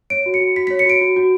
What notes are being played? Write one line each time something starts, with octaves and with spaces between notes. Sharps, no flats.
C#5 D7
F#4
C#7
F#4
F#4 B6
B6
C#5
C#7
F#4 D7
F#4
F#4